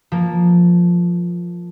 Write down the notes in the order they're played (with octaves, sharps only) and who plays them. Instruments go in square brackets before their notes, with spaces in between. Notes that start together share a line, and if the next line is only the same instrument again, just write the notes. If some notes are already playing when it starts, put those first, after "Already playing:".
[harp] F3 A#3